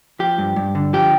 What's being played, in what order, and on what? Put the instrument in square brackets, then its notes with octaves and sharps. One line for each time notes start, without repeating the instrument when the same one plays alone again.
[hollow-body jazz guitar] F3 G4
G2
G2
D3
F3 G4